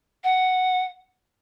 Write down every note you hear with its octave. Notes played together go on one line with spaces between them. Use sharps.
F#5